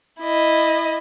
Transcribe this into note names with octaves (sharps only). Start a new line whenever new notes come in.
E4 D#5